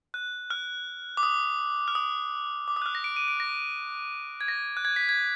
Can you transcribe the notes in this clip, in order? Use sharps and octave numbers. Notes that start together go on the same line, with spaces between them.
F#6
F6
D6
D#6
F6
D#6
D6
D#6
F#6
F6
A#6
D7
D#7
D7
A#6
G#6
A#6
F#6
G#6
B6
G#6